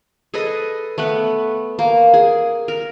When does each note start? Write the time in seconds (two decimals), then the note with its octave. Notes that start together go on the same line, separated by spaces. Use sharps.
0.34 G#4 A4 B4 D#5
0.98 A3 B3 B4
1.79 A#3
2.14 G#4
2.68 A#4